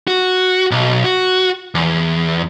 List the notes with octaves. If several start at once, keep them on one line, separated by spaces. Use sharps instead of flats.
F#4
B1
F#4
E2